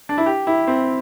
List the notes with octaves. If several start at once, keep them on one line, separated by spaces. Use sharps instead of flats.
D4
E4
G4
E4
C4